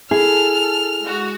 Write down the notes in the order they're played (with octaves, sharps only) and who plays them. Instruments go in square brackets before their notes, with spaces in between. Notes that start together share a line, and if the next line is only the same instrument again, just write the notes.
[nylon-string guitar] E4 [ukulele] G#4 [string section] A4 [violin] F6
[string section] G#3 F#4